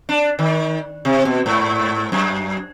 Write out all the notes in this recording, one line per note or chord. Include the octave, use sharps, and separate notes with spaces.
D4
D#3
C3
B2
G#2
F#2